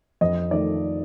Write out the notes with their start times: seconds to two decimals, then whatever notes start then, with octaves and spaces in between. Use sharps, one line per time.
0.21 F2 D#5
0.51 D#3 A3 D5